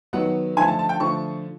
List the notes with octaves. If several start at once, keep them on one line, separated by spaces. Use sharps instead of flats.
D#3 F#3 B3 F#5
D3 F3 A3 G#5
A5
A5
G5
D3 F3 A3 C#6